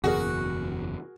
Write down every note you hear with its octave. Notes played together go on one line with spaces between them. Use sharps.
F#1 E2 B2 F#4 G#4 A#4